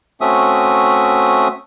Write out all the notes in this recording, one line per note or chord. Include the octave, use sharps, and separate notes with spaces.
A3 C4 C#4 F#4 E5 D#6